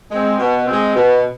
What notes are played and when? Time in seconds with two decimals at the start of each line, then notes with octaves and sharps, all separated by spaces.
0.10 G#3 C4
0.39 B2
0.66 G#3 C4
0.95 B2